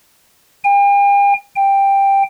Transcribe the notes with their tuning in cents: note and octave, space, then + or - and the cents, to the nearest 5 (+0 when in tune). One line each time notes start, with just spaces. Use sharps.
G5 +45
G5 +10